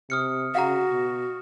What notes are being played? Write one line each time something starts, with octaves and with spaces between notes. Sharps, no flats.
C3 D#6 F6 C#7
C#3 F#4 F5 F#5 A#5
B2